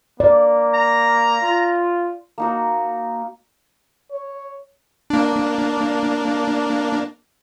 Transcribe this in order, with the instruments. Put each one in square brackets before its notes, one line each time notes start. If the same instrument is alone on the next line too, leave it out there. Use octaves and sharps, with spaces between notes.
[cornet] A#3 [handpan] D5
[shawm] A#5
[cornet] F4
[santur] A#3 D#4 F#4
[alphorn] C#5
[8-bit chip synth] A#3 D4